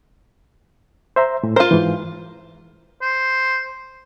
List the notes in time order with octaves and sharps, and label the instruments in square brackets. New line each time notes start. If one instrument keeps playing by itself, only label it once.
[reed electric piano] C5 E5 A#5
A2
[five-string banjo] F4 C5 [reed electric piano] A#4 F5
[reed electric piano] G#2 E3
[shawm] C5